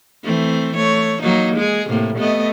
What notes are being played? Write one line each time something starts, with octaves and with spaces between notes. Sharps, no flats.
E3 A3 C4
A3 C#5
F#3 A#3 D#4
G#3 G#4
A2 C3 A#3
A3 B3 D#5